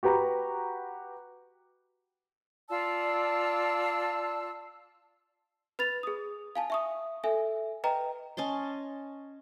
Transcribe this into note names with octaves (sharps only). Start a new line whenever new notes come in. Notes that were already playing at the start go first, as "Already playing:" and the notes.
F#4 G4 B4 A#5
F4 D5 A5 E6
B4 B5 A6 F7
G#4 D#6
F5 G#5 A5
E5 C#6 D#6
A4 E5 G#5
B4 D#5 G5 A#5
C#4 D#5 A5 C6